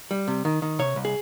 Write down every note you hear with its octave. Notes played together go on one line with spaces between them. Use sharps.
G3
C3
D#3
D#3
C3 C#5
C2
G#4